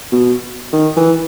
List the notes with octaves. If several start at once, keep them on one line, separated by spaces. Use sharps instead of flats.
B2
D#3
E3